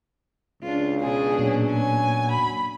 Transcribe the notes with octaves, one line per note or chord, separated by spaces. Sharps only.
C#2 D4 F4
B2 C#4 D4 G#4
A#2 F#3
G#5
B5